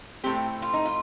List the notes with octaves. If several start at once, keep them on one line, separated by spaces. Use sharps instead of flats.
A2 A3 C4 G4
F4
D#4
F4